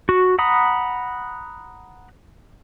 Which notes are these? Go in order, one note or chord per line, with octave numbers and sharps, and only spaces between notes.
F#4
F#5 A#5 B5 D#6